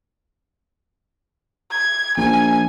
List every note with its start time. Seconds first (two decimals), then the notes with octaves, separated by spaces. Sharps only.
1.71 G#6
2.17 A#1 G#5